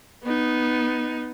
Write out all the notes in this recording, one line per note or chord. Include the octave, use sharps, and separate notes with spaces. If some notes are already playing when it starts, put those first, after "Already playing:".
B3 D#4